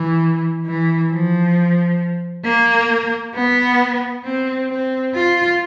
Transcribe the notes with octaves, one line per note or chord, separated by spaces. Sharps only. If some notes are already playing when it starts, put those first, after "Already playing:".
Already playing: E3
E3
F3
A#3
B3
C4
C4
F4